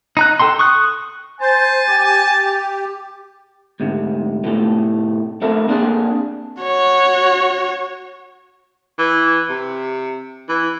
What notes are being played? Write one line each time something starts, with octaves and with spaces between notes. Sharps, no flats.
D#4 A#5 F#6
A4 G5 A#5 C6
C#6 D#6 F#6
C5 G#5 A5
G4
D2 G#2 C3
A2 C3 A3
A3 C4 A4 A#4
A#3 C4 D4 G#4
F#4 C#5
E3
C3
E3